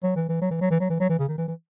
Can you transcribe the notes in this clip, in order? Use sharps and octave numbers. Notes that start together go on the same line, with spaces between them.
F#3
E3
E3
F#3
E3
F#3
E3
F#3
E3
F#3
E3
C#3
D#3
E3
E3